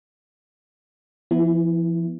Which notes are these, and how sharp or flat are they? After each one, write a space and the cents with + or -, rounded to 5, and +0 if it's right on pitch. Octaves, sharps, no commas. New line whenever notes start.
F3 -45 B3 +0 E4 +0